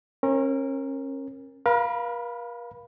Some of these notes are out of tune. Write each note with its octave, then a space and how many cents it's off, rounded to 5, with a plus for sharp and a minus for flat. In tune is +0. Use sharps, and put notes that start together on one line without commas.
C#4 -35 A#4 +0
A#4 +45 F5 +0 B5 +0